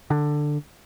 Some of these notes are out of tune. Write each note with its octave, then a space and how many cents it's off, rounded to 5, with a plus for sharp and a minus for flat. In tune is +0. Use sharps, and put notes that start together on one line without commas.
D3 +10